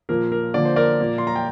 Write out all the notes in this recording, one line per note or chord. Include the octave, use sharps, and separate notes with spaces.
A#2 F3 A#3 A#4
A#4
D3 F3 A#3 D5
C5
A#4 D5
A#2 F3 A#3
C6
A#5
G5